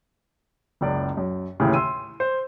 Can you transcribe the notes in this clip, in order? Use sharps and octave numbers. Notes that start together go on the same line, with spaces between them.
F#1 C#2 D5
F#2
D#2 A2 C#3 E3
C6 E6 D#7
C5